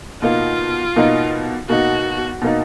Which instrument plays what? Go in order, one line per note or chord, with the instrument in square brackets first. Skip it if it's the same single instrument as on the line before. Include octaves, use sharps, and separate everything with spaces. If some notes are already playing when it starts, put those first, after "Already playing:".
[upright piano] B2 A#3 D#4 [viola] F4
[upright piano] B2 A#3 D#4
[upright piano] B2 A#3 D#4 [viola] F#4
[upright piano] B2 A#3 D#4